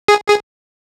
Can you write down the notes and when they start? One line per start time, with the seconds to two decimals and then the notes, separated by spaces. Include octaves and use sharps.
0.08 G#4
0.28 G#4